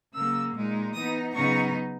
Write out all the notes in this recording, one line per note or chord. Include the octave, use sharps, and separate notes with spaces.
C#3 F#3 A#3 E6
A#2 G#3 D#4
E3 B3 D#4 D#6
C#3 F#3 B3 D#4 C#6